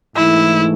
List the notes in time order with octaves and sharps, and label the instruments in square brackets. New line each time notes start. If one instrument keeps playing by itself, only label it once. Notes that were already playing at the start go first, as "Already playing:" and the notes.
[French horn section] G#2 E3 A3 [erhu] E4